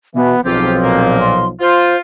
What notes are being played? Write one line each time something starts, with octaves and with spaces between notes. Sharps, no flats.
B2 E3 B3
B1 G#2 F3 C4 F4 G4
A#2 A#3
C6
F4 C5